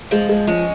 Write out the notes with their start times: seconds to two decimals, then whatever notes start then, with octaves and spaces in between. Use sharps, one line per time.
0.11 F3 G#3
0.29 G#3
0.47 F3 G#3 C#4